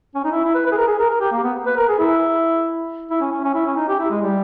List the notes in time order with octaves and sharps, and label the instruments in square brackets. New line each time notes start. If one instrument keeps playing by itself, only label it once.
[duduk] C#4
D#4
E4
E4
B4
B4
G#4
A#4
G#4
A#4
A#4
G4
A#3
B3
B4
A#4
G#4
E4
E4
C#4
C#4
C#4
E4
C#4
D#4
G4
E4
G#3
G3